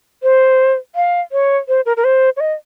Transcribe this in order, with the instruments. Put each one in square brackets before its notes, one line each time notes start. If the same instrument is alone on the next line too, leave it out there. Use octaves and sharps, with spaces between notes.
[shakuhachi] C5
F5
C#5
C5
A#4
A#4
C5
C#5
D#5